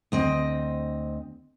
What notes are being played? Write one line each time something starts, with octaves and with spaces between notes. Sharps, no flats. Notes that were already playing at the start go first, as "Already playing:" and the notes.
D2 C4 D#5